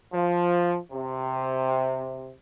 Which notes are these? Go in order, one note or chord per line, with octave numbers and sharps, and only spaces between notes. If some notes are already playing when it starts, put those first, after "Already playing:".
F3
C3